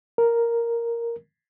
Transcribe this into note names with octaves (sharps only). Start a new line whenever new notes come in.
A#4